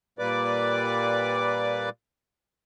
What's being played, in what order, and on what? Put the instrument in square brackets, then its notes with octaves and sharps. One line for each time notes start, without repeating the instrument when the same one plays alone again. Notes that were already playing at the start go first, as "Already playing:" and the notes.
[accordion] A#2 G3 A#3 B4 D5 D6